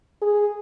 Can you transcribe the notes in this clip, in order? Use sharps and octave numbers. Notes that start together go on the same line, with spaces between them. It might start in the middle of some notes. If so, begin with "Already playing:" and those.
G#4